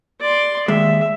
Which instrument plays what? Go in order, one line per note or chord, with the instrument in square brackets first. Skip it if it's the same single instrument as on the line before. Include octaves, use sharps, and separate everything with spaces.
[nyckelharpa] D5 C6
[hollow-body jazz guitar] D#2 G#3 [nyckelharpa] E5